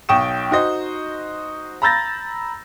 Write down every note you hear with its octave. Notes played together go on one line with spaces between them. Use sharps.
B1 G5 C#6 D#6 E7
D#4 F#4 C5 D#5
A#5 B5 E6 G6 A6 A#6